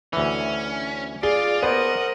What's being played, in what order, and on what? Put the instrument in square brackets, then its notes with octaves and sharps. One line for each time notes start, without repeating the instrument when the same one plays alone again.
[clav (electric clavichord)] D2 E3 [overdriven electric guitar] C#4
[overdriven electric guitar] F4 [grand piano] G#4 [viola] D5
[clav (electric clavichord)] B3 [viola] A#4 D#5 [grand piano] C5 [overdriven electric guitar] F#5